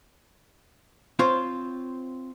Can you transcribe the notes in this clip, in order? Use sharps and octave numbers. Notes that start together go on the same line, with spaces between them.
C4 F4 C5 C#5